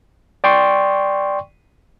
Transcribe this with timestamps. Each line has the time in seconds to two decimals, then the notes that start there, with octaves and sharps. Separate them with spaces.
0.44 D5 G5 C6 C#6